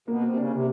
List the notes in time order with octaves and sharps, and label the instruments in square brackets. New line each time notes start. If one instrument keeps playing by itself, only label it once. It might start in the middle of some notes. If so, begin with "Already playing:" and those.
[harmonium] B2 [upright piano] A#3
[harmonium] C3
[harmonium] C#3 [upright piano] D4
[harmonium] C3